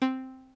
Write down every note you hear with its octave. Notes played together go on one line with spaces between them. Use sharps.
C4